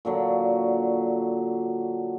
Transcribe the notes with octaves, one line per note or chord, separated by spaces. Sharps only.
A#2 D3 F#3